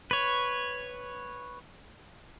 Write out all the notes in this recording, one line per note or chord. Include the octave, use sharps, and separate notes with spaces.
B4 C#5